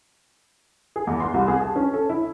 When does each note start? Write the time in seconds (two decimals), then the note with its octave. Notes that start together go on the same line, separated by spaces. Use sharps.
0.96 G#4
1.07 E2
1.20 C6
1.34 C2
1.48 G#4
1.61 A5
1.76 C#4
1.94 A4
2.09 E4